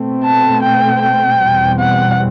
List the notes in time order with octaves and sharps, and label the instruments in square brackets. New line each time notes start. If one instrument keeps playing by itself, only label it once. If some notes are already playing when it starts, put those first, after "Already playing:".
Already playing: [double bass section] B2 A3 C4
[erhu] A5
G5
G5
[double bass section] E2 B2 G3 C4
[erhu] F#5